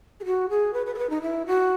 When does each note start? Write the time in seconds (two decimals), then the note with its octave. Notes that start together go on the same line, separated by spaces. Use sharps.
0.20 G#4
0.25 F#4
0.49 G#4
0.73 B4
0.86 B4
0.94 A4
0.98 B4
1.10 D#4
1.22 E4
1.46 F#4